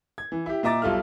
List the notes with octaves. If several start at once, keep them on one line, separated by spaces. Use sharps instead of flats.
G#6
E3
E4 G4
A#2 D#5 E5 A#5 D6 A6
B1 G3 F4 A4 E5 F6